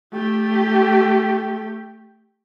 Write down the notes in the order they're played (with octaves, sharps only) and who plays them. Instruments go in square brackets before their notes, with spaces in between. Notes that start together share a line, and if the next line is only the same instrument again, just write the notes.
[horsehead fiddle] A3 G4